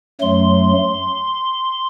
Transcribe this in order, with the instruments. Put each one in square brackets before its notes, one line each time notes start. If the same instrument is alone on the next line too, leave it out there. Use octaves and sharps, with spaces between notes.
[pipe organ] F#2 F#3 A3 C6